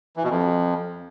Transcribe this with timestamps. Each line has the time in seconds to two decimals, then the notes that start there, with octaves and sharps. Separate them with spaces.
0.17 E3
0.23 B2
0.30 F2